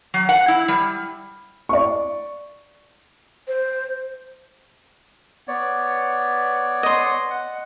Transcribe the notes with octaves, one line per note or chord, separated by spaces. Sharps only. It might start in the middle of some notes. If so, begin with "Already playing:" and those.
F#3
F#5
E4
G3
D5 C#6
C5
B3 C#5 D5
D#5 C6
F#5